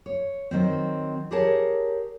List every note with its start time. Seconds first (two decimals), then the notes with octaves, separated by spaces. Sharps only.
0.06 C#5
0.51 D#3 F#3 C4
1.31 G4 G#4 A#4 C#5 A5